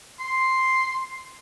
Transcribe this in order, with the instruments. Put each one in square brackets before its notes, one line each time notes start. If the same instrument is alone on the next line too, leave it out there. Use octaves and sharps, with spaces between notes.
[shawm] C6